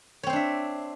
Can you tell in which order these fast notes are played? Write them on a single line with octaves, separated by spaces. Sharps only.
C#5 C4 C5 D4 E5